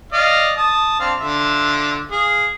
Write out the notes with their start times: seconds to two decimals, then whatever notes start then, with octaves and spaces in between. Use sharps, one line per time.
0.12 D5 D#5 F5
0.57 A5 D#6
1.00 C4 D4 F5
1.18 D3 F4 E5
2.11 G#4 F5